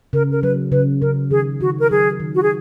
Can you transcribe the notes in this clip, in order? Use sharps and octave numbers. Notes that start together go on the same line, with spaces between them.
C#3 A#4
A#4
F#3 B4
C#3 B4
C#3 A#4
D#3 G#4
D#3 F#4
A#4
F#3 G#4
D#3
F#4
G#4